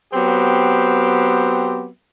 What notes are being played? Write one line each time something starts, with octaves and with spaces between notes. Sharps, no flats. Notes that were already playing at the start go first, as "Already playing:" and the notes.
F#3 B3 C4 G4